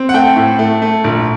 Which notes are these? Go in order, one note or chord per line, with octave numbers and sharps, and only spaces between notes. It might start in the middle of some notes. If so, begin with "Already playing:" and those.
Already playing: C4
F#5
A3 G5
A2
A3
A3
A#1